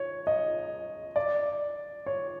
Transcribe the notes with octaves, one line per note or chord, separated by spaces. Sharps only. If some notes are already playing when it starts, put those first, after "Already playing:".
Already playing: C#5
D#5
D5
C#5